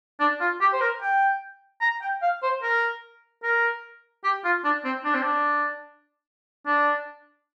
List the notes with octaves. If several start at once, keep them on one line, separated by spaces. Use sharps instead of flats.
D4
F4
G4
C5
A#4
G5
A#5
G5
F5
C5
A#4
A#4
G4
F4
D4
C4
D4
C4
D4
D4